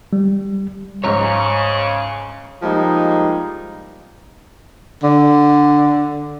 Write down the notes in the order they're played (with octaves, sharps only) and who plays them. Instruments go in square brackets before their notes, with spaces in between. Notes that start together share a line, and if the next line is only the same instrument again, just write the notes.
[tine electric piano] G3
[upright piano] C#2 G#2 [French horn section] C#3 [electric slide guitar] C#5 A#5 [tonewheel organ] C#6
[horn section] F3 G3 G#3 A#3 D#4
[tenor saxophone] D3